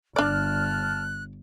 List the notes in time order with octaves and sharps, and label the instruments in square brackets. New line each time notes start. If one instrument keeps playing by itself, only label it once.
[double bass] G1 [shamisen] D4 D5 [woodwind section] A5 F6 [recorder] F#6